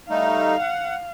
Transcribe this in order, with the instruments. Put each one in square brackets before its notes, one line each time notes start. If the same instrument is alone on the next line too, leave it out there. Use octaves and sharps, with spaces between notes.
[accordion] G3 A3 D#4 [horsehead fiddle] F5
[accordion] F#5